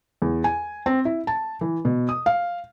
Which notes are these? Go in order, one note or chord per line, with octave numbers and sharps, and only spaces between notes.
E2
G#5
C4
E4
A5
E3
B2
D#6
F5